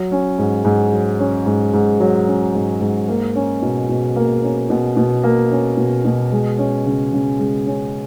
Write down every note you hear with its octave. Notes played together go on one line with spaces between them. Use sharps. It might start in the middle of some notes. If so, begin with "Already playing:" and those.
Already playing: F#3
C#4
G#2
G#2
F#3
C#4
G#2
G#2
F#3
C#4
G#2
G#2
A#3
C#4
B2
B2
A#3
C#4
B2
B2
A#3
C#4
B2
B2
G#3
C#4
C#3
C#3
G#3
C#4